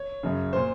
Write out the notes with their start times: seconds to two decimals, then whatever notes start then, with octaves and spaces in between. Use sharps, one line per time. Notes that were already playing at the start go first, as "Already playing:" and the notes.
Already playing: C#5
0.23 F#2 C#3
0.53 A#2 C5